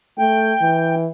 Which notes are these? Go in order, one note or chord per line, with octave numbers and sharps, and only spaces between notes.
A3 G5
E3